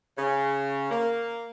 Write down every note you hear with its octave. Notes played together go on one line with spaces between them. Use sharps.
C#3
A#3